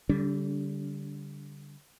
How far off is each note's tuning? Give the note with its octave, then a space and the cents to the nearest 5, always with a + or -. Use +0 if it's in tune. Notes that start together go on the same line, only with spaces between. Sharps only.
D3 -25 G3 +0 D4 -45